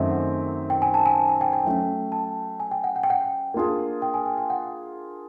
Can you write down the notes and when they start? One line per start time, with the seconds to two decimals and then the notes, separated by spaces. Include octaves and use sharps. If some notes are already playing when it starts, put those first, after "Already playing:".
Already playing: F#2 D#3 F#3 A3 C4 D#5 E5
0.11 F#5
0.70 G5
0.82 G#5
0.94 A5
1.06 G#5
1.29 G#5
1.41 G5
1.53 G5
1.65 F#3 A3 C#4
2.12 A5
2.60 G#5
2.71 G5
2.84 F#5
2.96 F#5
3.03 G5
3.10 F#5
3.54 A#3 D4 F4 G#4
4.02 G5
4.14 G#5
4.26 G5
4.38 G5
4.50 F#5